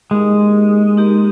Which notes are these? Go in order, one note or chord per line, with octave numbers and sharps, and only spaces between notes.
G#3 A#3 D#4 G4 A#4
A#3 D#4 G4 A#4